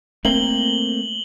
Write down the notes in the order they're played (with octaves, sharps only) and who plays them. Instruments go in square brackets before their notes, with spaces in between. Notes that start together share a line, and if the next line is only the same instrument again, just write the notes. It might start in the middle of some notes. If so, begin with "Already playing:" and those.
[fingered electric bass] A3 A#3 C4 [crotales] F#7 G7